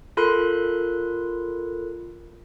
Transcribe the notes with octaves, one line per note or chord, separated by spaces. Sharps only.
F4 A4 A#4 B5 C6 F#6